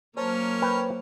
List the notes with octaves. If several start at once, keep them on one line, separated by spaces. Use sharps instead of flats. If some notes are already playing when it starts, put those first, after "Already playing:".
F#3 A#3 C#4 A#4 C5 C#5 A5
B4 G5